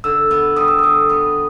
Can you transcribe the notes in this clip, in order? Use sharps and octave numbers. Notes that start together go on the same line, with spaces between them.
D3 E6
B3
G3 D#6
E6
D3 D#6
B3